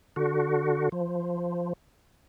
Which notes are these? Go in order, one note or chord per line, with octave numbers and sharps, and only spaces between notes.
D3 F#4
F3